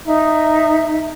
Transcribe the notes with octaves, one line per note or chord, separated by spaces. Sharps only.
D#4 E5